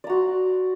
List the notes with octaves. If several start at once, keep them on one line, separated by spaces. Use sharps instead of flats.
F#4 D5 A#5 C6